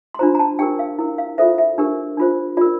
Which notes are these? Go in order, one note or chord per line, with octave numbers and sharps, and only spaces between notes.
C6
D4 F4 C5 A#5
A#5
A5
D4 G4 A#4 G5
F5
E4 A#4
F5
F4 A4 C5 E5
E5
D4 G4 A#4
D4 F4 C5
F4 A#4 D5